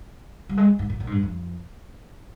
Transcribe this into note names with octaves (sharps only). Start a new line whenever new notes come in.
G3
G#3
G#2
A#2
A#2
G#2
G2
F2